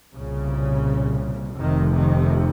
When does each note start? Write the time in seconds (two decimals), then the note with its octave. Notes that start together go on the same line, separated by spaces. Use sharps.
0.14 C2 A#2 C#3
1.59 F1 F2 C3 D#3
1.96 D#3